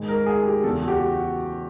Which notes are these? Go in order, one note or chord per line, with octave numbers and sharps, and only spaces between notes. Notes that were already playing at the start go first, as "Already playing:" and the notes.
Already playing: G#2 D#3 G#3
A#4
G#4
G4
E2 C#3 E3 A4
F#4
G4
F#4